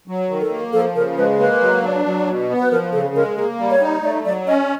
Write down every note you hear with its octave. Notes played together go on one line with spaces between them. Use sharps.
F#3
D#3
A4
A#3
F3 A4
C#3 A#4
G#3 B4
A#3 B4
F#3
D4
F#3
B2
B3
B4
F3 A#4
C#3 A4
G#3 A#4
A#3 G#4
G3
C#5
D#4
A3 D5
F#3 D5
C#4 D#5